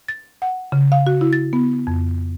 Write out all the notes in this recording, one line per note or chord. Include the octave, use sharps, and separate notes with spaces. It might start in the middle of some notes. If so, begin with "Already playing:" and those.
A6
F#5
C#3
F5
F#4
E4
A6
B3
F2